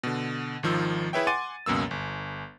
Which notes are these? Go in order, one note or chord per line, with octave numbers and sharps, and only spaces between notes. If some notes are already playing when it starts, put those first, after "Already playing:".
B2 D3
G#1 D#3 F3 F4 E6
E4 G#4 B4 C#5 E5 G5
F#5 G#5 C6 D6 A6 D#7
C#2 F#2 B2 A#3 E6
G1